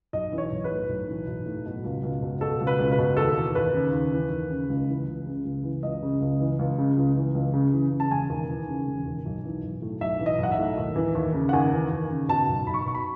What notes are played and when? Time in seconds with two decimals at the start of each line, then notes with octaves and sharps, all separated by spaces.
0.13 B1 D#5
0.32 E3
0.38 C#5
0.52 B1
0.64 B4
0.70 A2
0.89 B1
1.08 E3
1.27 B1
1.46 A2
1.66 B2
1.84 C#2
2.03 C#2
2.22 B2
2.41 B2 A4
2.60 C#2
2.67 B4
2.79 C#2
2.92 B4
2.98 B2
3.17 D#2 A4
3.36 E3
3.55 D#2 B4
3.74 C#3
3.93 D#2
4.12 E3
4.31 D#2
4.50 C#3
4.69 C#2
4.88 E3
5.07 C#2
5.26 C#3
5.45 C#2
5.64 E3
5.83 C#2 D#5
6.03 C#3
6.21 C#2
6.40 E3
6.59 C#2
6.78 C#3
6.97 C#2
7.16 E3
7.34 C#2
7.54 C#3
7.73 E3
7.92 C#3
8.00 A5
8.11 E1 G#5
8.30 D#2
8.48 E3
8.68 C#3
8.87 E1
9.06 D#2
9.25 B1
9.44 E3
9.64 B1
9.82 A2
10.01 B1 E5
10.19 E3
10.26 D#5
10.39 B1 F#5
10.52 E5
10.58 A2
10.78 D#2
10.96 E3
11.15 D#2
11.34 C#3
11.49 F#5
11.53 D#2 G#5
11.72 E3
11.91 D#2
12.10 C#3
12.28 B2 A5
12.49 B1
12.67 B1 B5
12.74 C#6
12.81 B5
12.86 B2 C#6
12.95 B5